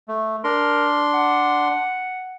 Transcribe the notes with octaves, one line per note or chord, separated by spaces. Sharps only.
A3
D4 A#4 C6
F#5